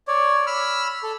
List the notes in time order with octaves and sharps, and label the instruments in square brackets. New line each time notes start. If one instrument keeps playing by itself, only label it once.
[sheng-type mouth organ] C#5 D5
B5 E6 F6
A4